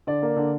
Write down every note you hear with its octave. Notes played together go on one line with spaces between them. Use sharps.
D3 D5
A#3
D3